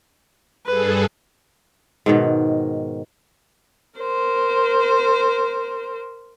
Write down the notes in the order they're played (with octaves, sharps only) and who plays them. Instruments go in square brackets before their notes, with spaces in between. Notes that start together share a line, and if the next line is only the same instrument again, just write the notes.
[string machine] G2 G#4 A4 [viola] B4
[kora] G#2 B2 D#3
[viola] A#4 C5